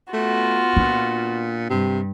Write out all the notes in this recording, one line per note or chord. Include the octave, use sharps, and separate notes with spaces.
A3 B3 F4 F#4
A#2 D4
G2 C3